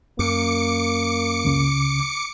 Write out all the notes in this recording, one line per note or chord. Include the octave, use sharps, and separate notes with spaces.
F#2 A#3 D6 C#7
C#2 C#3